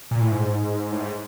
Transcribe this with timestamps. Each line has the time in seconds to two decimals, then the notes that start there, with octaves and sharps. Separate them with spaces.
0.11 A#2
0.21 A2
0.32 G#2
0.92 A2
1.01 G#2